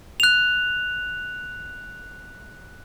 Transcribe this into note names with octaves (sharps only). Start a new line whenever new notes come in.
F#6 F7